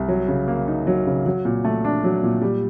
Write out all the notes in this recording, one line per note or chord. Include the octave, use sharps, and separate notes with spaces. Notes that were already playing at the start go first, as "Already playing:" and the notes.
Already playing: C2
F#3
C#3
A#3
D#4
F#3
C#3
F#3
A#2
A3
D4
F#3
A#2
G3